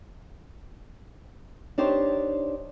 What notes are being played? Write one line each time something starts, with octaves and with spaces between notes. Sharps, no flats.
D4 D#4 G4 C5 C#5